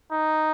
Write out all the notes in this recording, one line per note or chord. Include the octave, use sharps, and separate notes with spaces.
D#4